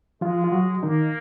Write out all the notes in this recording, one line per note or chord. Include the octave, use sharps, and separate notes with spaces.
F3 G#3 F4
F4
F#3 F#4
D#3 A#3 D#4